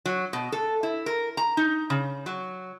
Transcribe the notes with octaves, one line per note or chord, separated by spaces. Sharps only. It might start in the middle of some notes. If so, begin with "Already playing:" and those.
F#3
B2
A4
E4
A#4
A#5
D#4
C#3
F#3